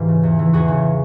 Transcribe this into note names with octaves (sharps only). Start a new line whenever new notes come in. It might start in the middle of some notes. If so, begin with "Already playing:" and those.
Already playing: G#2 E3 F4 G4
C#3
E2
E3
E2 F#4 G#4
C#3